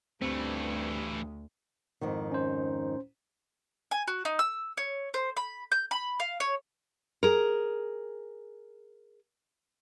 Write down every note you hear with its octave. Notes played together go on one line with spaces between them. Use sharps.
D2 G2 E3 A3 C4
F2 G#2 D#3
C#4 C5
G#5
F#4
D#4
E6
C#5
C5
B5
G6
B5
F5
C#5
G#4 A#4